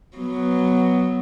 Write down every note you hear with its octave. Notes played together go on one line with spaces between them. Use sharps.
F#3 B3